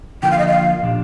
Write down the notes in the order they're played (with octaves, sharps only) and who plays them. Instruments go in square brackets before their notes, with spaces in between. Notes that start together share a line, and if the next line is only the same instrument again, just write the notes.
[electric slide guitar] D3 F3 A#3 F4 [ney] G5
[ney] F5
D#5
F5
[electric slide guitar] A#2 F3 A#3 D4 G4